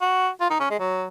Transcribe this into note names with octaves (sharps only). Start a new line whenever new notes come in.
F#4
F4
D#4
C#4
G#3
F#3